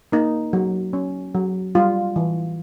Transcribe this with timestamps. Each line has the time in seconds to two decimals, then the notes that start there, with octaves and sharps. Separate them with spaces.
0.12 A#3 D#4
0.53 F#3
0.93 C#4
1.34 F#3
1.75 G3 F4
2.16 E3